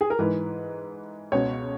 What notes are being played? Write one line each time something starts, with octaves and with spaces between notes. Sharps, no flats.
G#4
A#4
G#2 E3 B4
C#2 B2 C#5